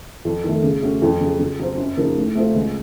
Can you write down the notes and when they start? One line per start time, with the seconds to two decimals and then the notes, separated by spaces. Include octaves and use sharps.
0.25 F2
0.44 D#3 A3
0.63 C#3
0.82 A3 C#4 F#4
1.02 F2
1.20 C#3 F#3
1.39 C#3
1.59 F#3 C4
1.78 F#2
1.97 C#3 F3 A#3 D#4
2.16 A2
2.35 A3 C4 F4
2.54 C#2